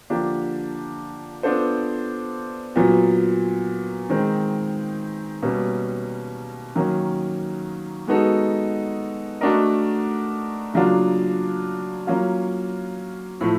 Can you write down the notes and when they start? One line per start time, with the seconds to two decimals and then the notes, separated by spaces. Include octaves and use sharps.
0.10 D3 F3 A#3 D4 G4
1.43 B3 D4 F4 A4 C5
2.76 A#2 F#3 B3
4.10 D#3 G#3 C4
5.42 B2 G3 A#3 C#4
6.75 D#3 F#3 A#3 C#4
8.08 G#3 B3 D#4 F#4 A4
9.41 A3 D4 F#4 A#4 D#5
10.74 C#3 F#3 A#3 D4 F4
12.07 F#3 A#3 C#4 F4
13.41 A2 F3 A3